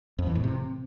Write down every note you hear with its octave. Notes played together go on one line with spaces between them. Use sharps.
F2
E3
A2
C3